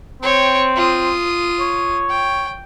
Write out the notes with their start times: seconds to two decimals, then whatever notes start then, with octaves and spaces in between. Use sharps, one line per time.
0.23 C4 C#5 G5
0.76 F4 D#6
1.60 C#5
2.10 G5